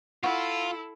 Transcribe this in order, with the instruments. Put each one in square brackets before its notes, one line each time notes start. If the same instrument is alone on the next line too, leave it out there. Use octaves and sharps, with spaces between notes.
[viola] E4 A4 [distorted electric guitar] F4 [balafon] F#5 C#6